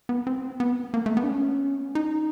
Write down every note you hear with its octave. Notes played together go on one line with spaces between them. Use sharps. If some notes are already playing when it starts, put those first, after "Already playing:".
B3
C4
B3
A#3
A3
B3
D4
C#4
D#4